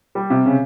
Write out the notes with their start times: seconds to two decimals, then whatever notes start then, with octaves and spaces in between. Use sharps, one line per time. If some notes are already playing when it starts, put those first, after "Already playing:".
0.15 G3
0.30 C3
0.45 C#3